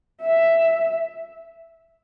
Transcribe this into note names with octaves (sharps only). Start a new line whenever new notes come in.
E5